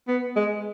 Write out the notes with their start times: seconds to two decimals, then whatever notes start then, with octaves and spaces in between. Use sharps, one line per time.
0.08 B3
0.36 G#3